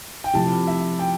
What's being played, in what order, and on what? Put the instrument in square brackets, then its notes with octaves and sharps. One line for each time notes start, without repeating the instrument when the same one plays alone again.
[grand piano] G5
[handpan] C3 F3 A3 E4 G4 [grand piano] A5
[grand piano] E5
G5